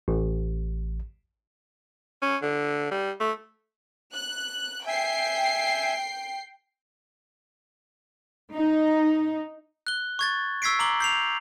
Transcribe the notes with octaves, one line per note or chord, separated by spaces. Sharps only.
A1
C#4
D3
G3
A3
F#6
E5 G5 G#5 C7
D#4
F#6 G7
C#6 G#6 A6
C#6 E6 G#6 B6 C7 D7
A#5 D6 F#7 G7
G6 C7 F7